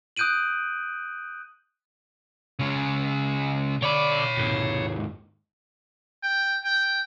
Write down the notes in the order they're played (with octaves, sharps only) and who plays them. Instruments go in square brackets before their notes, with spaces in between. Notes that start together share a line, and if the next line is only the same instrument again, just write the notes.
[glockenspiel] D#6 F#6 G6 D7 D#7 F#7
[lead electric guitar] C#3 G#3
[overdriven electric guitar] D3 D5 [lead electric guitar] C#5 B5
[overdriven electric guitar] D#2 G#2
[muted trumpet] G5
G5